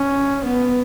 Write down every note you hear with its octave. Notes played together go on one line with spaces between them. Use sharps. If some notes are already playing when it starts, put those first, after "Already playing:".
Already playing: C#4
B3